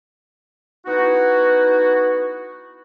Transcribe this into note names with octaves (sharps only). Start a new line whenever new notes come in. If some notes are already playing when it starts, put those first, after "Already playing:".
B3 D#4 E4 F#4